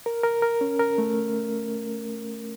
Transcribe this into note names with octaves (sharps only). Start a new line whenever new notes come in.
A#4
A#4
A#4
C#4
A#4
A3